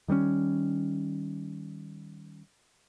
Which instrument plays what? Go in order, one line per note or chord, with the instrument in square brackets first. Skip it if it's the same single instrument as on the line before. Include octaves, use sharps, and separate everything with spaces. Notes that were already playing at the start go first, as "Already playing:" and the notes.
[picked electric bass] D#3 G3 G#3 C#4